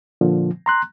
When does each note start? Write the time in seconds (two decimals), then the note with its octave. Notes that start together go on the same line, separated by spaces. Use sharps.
0.21 A#2 D3 F3
0.66 A#5 C6 F#6